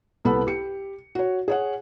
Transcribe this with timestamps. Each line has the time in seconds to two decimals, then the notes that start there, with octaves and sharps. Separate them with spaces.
0.25 C2 B3 E4 A4 B5
0.47 G4 C#7
1.15 F#4 C#5
1.48 G#4 C#5 F#5